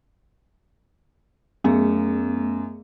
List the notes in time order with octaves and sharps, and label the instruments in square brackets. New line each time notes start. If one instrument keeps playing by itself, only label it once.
[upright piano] F#2 [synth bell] A3 B3 G#4